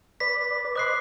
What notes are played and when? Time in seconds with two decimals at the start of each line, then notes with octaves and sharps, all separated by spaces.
0.20 B4 D5 B6
0.75 C5 D#5 B5 D6 F#6 C7